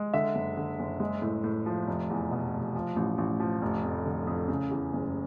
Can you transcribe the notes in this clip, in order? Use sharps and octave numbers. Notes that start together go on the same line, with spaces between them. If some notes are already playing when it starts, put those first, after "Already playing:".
Already playing: G#3
D3 E5
F#1
D3
F#1
G#3
A2
A2
F3
F1
E2
B2
F1
F3
A1
A1
F3
F1
F2
D3
F2
C#3
E2
F#1